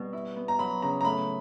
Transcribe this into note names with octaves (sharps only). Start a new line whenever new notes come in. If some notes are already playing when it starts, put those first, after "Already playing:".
Already playing: B2 G3
E4
B3
A#5
F#3 B5
C#3 A#5
A#5
A2 B5